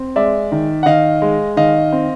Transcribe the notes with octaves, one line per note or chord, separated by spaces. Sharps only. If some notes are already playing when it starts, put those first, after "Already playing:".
Already playing: C4
G#3 D5 E5
D#3
F#5
D#3 D#5 F5
G#3
D#3 D#5 F5
C4